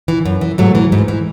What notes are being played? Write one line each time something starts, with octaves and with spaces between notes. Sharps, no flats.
E3
F#2
E3
G#2 F#3 A3
E3
G#2
E3